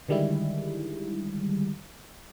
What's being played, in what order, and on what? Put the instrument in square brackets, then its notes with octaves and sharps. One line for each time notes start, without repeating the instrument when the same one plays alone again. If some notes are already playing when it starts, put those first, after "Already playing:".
[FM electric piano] D3 D#3 G3 G#3 E4